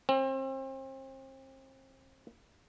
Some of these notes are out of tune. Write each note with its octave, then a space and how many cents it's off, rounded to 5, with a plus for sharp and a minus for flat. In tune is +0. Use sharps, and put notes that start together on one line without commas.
C4 +35